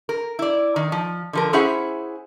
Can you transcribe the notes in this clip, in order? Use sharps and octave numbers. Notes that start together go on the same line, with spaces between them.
A#4
E4 D5
D#3
F3
D3 F3 A#4
C#4 E4 G#4 C5 E5 F#5